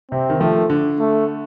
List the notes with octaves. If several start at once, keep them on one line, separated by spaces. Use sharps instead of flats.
C3 C4
D#3
F3 A3
D3
A3